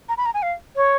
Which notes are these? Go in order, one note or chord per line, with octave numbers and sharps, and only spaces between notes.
A#5
B5
A#5
G#5
F5
C#5